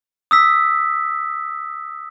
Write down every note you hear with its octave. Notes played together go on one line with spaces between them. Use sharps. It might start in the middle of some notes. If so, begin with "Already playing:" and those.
D#6 E6 B6